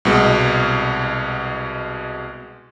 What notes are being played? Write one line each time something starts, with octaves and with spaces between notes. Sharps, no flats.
C2 B2 G#3